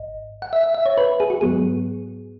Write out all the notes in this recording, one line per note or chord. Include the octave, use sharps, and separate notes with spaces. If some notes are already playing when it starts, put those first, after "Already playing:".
Already playing: G#1 G#2 D#5
F#5
E5
E5
E5
C#5
B4
G#4
F#4
G#2 F#3 B3 G#4